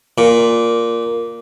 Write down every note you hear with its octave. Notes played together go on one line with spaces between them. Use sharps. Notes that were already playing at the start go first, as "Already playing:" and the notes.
A#2